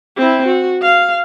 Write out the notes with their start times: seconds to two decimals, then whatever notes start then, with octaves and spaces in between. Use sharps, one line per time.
0.17 C4 E4
0.46 F#4
0.82 F5